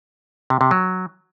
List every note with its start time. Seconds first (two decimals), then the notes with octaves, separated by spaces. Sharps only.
0.50 C3
0.61 C3
0.71 F#3